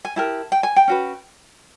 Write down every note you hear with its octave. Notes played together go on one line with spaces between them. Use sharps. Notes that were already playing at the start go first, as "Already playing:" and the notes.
G#5
E4 G4 A#4 A5
G5
G#5
G5
C#4 F#4 B4